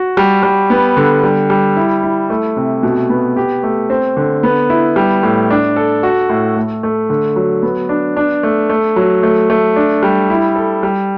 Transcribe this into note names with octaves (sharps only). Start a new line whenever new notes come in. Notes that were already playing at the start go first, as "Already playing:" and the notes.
Already playing: F#4
G3
G3
B3
D3
G3
G3
E4
E4
A3
C3
B2
B3
G4
A3
C4
D3
B3
E4
G3
A2
D4
A4
F#4
A2
A3
A3
D3
F#3
B3
D4
D4
A3
A3
F#3
A3
A3
D4
G3
E4
A4
G3